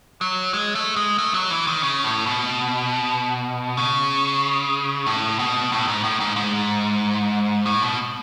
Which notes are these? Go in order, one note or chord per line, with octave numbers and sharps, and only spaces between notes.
F#3
G#3
A3
G#3
A3
F#3
E3
D#3
C#3
A2
B2
C#3
A2
B2
A2
G#2
A2
G#2
G#2
A2
B2